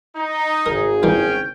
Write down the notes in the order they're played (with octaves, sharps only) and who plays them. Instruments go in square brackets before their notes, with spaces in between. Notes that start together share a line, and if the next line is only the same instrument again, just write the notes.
[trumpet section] D#4
[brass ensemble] G#1 G#4 [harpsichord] A#4
[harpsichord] E3 G3 A#3 [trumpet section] C#4 [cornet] G5